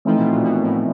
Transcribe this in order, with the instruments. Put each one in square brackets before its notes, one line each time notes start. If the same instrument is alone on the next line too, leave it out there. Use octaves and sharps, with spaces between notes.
[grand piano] E3 A3 C4 D#4 [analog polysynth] F3
[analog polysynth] B2
A#2
B2
A2